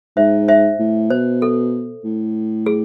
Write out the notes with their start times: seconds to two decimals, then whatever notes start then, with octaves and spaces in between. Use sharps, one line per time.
0.17 G#2 C5 E5
0.48 C5 E5
0.79 A2
1.10 B2 C5
1.42 A4
2.04 A2
2.66 G#4